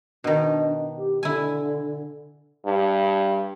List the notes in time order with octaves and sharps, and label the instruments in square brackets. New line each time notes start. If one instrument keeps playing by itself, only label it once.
[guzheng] B2 D#3 [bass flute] D4
[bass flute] G4
[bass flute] D3 [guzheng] E4 G#5
[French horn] G2